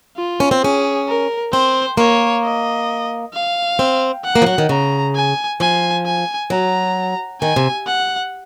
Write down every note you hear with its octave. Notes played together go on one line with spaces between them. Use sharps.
F4
C#4
C4
C#4 G#4
A#4
C4 C5
A#3 C#5
D#5
F5
C4
F#5
A#3
F3
F#3
D#3
C#3 A#5
G#5
F3 G#5
G#5
F#3 A#5
D#3 G#5
C3
F#5